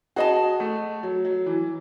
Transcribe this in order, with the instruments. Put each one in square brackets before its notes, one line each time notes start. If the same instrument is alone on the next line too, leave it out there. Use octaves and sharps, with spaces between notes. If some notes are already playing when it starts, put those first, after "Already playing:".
[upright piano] F#4 [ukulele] G#4 D#5 A5
[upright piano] A3
F#3
F#3
E3